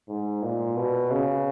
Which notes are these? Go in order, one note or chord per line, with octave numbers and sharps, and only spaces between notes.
G#2
A#2
B2
C#3